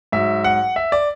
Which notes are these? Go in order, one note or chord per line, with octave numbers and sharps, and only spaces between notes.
G#2 F#3 E5
F#5
E5
D5